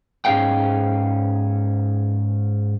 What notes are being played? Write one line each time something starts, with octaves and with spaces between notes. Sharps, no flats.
G#2 C#4 G#4 D#5 F5 G5